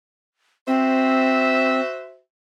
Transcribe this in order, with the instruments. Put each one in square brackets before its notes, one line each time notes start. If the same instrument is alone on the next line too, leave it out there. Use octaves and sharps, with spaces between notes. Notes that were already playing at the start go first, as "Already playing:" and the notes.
[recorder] C4 [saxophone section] F#4 C5 E5